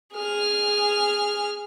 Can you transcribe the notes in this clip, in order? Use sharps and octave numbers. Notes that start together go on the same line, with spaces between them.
G#4 F6